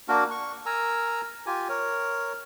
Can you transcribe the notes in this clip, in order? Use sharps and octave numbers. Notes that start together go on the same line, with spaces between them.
A#3 D4 F#4 A#4
C#6
A#4 G#5 A#5 E6
F4 G4 G#5
A#4 C#5